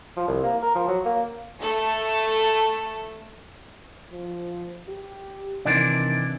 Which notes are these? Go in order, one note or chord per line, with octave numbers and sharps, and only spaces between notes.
F3
C2
A#3
A#4
F3
F#3
A#3
A3 A4
F3
G4
C3 D#3 E3 D4